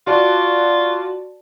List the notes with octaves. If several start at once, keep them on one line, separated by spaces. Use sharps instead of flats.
F4 F#4 D5 A5